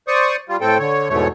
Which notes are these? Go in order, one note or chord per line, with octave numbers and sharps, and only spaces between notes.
C5 D5 C#6 D#6
G3 F4
A2 C4 A4 G5
D3 C#5
E2 G#2 B2 A3 C#5